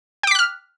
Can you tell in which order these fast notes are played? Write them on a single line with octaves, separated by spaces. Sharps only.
G5 D6 B6 F#6 F6